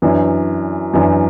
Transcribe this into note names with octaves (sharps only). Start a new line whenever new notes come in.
F#2 E3 D4
F#2 E3 D4